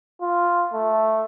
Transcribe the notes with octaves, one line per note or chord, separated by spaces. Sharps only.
F4
A3